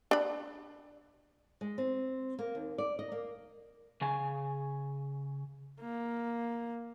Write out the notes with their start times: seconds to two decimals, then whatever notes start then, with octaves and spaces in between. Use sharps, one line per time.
0.11 D4 B5
1.61 G#3
1.78 C4
2.39 A#3
2.55 D#2
2.78 D5
2.99 D#5
3.12 A#3
4.01 C#3 G#5
5.81 A#3